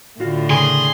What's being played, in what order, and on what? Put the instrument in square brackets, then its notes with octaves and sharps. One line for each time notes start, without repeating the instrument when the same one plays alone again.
[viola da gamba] A2 D3 [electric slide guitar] F4 F#4 F5
[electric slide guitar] C#3 A#4 [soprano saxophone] G#4 [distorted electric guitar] C6